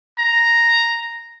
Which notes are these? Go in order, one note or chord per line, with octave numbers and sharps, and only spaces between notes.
A#5